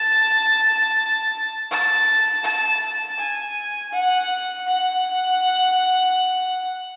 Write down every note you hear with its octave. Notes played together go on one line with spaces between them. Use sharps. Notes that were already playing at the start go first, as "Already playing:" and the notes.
Already playing: A5
A5
A5
G#5
F#5
F#5